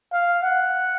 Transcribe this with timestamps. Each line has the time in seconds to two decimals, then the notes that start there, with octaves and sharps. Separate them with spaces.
0.13 F5
0.42 F#5